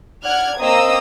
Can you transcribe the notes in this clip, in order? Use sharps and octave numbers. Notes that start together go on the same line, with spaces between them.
D5 F#5 F6 F#6 G#6
A#3 C4 D#5 A#5 D#6 E6